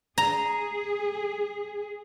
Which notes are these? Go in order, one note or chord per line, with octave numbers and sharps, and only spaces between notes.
G#4 A#5